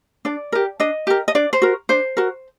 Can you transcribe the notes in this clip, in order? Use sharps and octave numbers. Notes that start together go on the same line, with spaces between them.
D4 D5
G4 A#4
D4 D#5
G4 A#4
D#5
D4 D5
C5
F#4 A#4
D4 C5
F#4 A#4